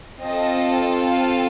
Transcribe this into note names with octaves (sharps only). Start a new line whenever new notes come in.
C4 F4 A4 D#5
F5